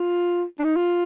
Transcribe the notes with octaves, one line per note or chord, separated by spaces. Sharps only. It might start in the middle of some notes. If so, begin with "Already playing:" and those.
Already playing: F4
D4
D#4
F4